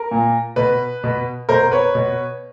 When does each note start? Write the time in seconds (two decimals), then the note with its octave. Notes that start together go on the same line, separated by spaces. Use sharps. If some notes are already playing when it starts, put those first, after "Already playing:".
Already playing: A#4
0.11 A#2
0.56 B2 B4
1.04 B2
1.49 B2 A#4 C5
1.72 B4 C#5
1.95 B2